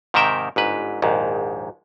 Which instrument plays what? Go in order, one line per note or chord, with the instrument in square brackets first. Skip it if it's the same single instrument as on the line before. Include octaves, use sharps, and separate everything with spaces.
[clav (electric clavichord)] G#2 C3 D#3 A#4 E5 G5
G1 G#2 B4
A#1 D#2 G#2